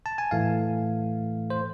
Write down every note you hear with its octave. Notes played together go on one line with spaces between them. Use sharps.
A5
G#5
A2 E3 A3 F5
C5